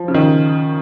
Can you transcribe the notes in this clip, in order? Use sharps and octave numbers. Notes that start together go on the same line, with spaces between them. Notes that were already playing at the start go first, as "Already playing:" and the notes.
Already playing: F3
C#3
D#3